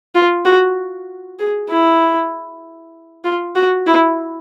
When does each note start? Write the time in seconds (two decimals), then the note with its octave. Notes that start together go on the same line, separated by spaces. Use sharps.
0.15 F4
0.45 F#4
1.39 G#4
1.70 E4
3.24 F4
3.56 F#4
3.86 E4